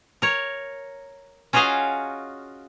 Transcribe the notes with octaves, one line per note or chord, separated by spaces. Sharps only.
A#4 C#5
C#4 F4 F#4 G#4 D#5 F5